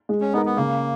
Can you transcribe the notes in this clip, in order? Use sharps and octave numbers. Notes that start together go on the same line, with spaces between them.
G#3
C#4
B3 D#4 A#4
B3
C#3 A#3